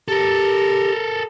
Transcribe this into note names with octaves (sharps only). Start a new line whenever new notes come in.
G4 A4 A#4